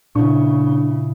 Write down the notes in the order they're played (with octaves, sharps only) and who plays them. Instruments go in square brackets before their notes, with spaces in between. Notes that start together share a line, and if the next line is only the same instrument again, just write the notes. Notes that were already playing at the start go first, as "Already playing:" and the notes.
[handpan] A#2 E4 [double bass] C#3 [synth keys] D4 C#6